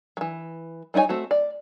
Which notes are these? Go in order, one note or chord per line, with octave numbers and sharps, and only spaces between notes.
E3 F#3
G3 D#4 E4 C#5 G#5
A3 C4 F#4
D5